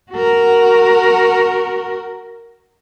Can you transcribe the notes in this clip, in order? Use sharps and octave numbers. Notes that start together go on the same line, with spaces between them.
F#4 A#4